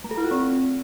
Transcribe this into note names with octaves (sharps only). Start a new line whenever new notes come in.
A3
A4
E4
F4
C4